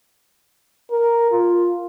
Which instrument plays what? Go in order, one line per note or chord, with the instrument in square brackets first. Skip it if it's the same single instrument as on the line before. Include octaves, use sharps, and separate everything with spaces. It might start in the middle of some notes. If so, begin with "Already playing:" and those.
[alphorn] A#4
F4